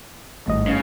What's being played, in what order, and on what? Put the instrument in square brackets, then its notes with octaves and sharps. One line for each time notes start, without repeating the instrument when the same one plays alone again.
[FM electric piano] G#1 D#5 [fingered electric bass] G2 A3
[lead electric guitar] C#3